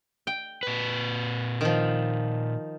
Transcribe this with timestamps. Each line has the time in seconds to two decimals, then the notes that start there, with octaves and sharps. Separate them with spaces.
0.27 G5
0.63 A#2 B4
1.61 D#3 F3